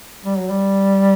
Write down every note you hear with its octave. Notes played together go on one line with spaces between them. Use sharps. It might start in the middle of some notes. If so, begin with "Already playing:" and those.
G3
F#3
G3